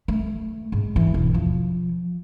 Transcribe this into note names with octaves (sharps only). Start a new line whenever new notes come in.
A3
G#2
E3
E1
F3